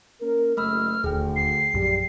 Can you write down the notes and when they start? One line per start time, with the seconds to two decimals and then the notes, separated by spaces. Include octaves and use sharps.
0.20 A#3 C#4 A#4
0.57 F#1 A3 B5 E6 F6
1.04 D#1 D2 G#4 G5
1.36 C7
1.74 A#1 F#2 G3